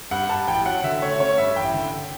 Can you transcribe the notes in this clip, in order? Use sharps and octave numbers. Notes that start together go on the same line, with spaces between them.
G2 F#5
G2 A5
A1 G5
F#3 F#5
D3 E5
A3 C#5
C#4 C#5
G2 E5
A1 G5
D3